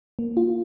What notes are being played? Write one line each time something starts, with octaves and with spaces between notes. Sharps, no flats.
A#3
F4